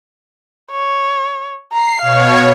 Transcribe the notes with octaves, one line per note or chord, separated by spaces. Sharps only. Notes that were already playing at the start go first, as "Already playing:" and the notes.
C#5
A#5 C7
B2 C#5 F5